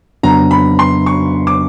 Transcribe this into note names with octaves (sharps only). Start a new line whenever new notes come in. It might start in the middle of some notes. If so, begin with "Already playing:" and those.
F2 C#3 F#3 B3 D4 A#5
B5
C6
C#6
D6